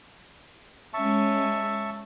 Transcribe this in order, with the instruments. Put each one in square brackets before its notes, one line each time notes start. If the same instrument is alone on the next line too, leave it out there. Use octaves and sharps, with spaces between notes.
[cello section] G#3 C#4 [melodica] E5 A5 C#6